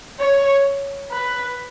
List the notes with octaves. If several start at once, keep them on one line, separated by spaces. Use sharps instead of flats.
C#5
B4